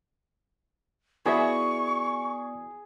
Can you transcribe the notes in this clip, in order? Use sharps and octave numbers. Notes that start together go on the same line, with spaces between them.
B3 E4 F#4 G#4 D5 E5 C#6